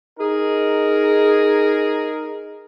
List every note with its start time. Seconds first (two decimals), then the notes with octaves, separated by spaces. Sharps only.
0.19 D#4 G#4 A#4